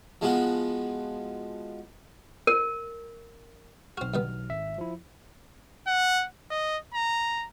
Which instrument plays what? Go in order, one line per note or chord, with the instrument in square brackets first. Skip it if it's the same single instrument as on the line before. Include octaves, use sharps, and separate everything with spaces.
[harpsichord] F3 G#3 B3 F4 F#4
[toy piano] A#4
[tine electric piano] B1 F6 [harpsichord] C4 F#4
[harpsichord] G2 D#3 B3
[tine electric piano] G#1 E5
F3 E4
[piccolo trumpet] F#5
D#5
A#5